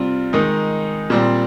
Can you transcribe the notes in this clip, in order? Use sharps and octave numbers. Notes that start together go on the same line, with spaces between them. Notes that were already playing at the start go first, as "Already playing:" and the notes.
Already playing: C3 G3 C4 F4
D#3 G#3 D#4
A#2 G3 C4